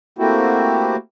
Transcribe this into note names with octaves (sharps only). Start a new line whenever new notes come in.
A3 A#3 C4 E4 F#4 G4